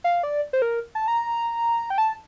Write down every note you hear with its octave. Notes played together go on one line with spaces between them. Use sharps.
F5
D5
C5
A#4
A5
A#5
G5
A5